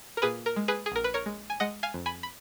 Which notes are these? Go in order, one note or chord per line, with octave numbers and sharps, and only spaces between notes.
A#4
A#2 G#4 B4
A#4
G#3
G#4 B4
G#4
A#1 A#4
B4
A#4 C#5
G#3
G#5
G#3 D#5 F#5
F5 G#5
F2
G#5 B5
B5